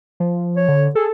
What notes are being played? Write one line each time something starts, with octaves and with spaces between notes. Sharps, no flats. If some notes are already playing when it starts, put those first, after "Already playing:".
F3
C#5
D3
G#4 A4